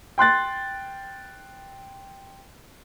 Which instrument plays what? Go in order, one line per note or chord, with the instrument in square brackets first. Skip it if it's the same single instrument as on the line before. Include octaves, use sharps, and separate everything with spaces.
[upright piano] G5 C6 F#6 A6